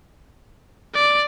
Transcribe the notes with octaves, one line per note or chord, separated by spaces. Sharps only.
D5